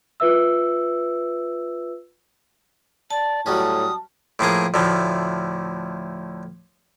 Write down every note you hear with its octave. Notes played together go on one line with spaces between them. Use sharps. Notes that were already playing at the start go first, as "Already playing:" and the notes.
F4 B4 E5 E6
D5 A5
A2 F#3 G3 C#4 D#6
A2 F3 A#3 G#4
D2 A2 F3